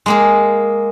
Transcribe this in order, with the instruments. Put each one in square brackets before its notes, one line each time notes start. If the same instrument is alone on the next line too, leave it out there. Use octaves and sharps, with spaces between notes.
[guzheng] G#3 A#3 G#4